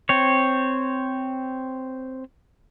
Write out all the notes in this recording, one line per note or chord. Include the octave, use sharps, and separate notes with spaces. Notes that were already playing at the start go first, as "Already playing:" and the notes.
C4 C#5